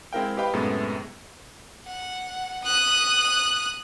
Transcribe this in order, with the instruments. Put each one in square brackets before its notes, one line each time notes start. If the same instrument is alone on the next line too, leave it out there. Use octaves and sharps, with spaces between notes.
[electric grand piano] G#3 C4 E4 A#4 F5 G5
G4 B4 D#5 F5 G5 B5
F#2 A2 C3 G#3 A3 B3
[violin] F#5
D#6 F#6